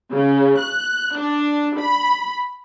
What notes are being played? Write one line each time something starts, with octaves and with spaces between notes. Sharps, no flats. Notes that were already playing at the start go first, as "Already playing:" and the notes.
C#3
F#6
D4
B5